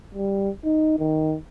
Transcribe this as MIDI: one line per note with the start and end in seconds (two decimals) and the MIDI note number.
0.15 0.50 55
0.64 0.95 63
0.99 1.35 51